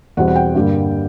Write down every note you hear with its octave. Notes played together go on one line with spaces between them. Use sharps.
E2 B2 G3 C4 F#5
F#5
G5
G2 D3 G3 A#3